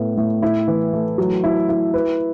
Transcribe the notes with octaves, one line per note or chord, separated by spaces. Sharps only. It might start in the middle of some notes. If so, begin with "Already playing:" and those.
Already playing: A2 B3
A2
E4
E3
A3
F#3
E4
E4
B4